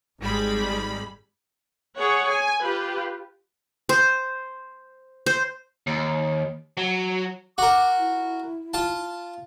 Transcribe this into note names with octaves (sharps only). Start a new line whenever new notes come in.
G#1 G3 G#3 B5
G#4 C#5 F#5
G#5
F4 G4 B4
C5
C5
D#2
F#3
F#4 A#4 D6
E4
F4 A5